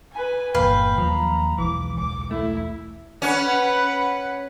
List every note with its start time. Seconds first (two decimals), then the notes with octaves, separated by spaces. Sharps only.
0.12 B4 G#5
0.54 G1 E2 A#2 B4 F5 G5
0.98 D#2 F3 F#3 A#3 A#5
1.58 B1 E2 E3 G#3 D6
1.97 C#2 D6
2.31 A3 E4
3.22 C#4 B4 F#5